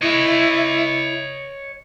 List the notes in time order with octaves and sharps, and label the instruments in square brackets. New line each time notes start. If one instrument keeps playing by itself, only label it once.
[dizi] E4 [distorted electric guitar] C#5 D#5